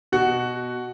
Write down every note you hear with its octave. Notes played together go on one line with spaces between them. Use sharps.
B2 F#4